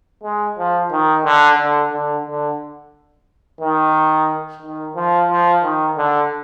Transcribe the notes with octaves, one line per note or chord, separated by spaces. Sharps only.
G#3
F3
D#3
D3
D3
D3
D3
D#3
D#3
F3
F3
D#3
D3